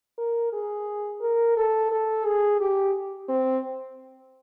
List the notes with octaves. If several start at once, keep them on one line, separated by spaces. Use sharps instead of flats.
A#4
G#4
A#4
A4
A4
G#4
G4
C4